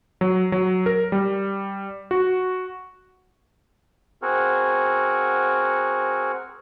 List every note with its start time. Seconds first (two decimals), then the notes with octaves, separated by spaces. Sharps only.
0.21 F#3
0.52 F#3
0.86 A#4
1.12 G3
2.11 F#4
4.22 C4 F#4 G#4 A#4